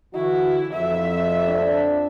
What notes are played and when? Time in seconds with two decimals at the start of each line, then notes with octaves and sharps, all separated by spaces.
0.15 D3 E3 E4 F#4
0.73 F2 E5
1.48 D4